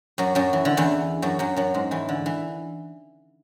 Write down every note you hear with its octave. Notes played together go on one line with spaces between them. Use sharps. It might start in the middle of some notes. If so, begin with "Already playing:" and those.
F#2 F#3
F#2 F#3
E3
D3
E2 E3
F#2 F#3
F#2 F#3
F#2 F#3
G#2 G#3
E2 E3
D3
E3